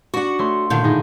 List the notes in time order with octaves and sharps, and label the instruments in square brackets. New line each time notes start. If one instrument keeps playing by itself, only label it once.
[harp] D4 C#6 [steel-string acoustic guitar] F#4 F#5
[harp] A3 C#5 C6
[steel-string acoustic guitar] A#2 D3 D#3 [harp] G6
[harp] A2 D#4 G#4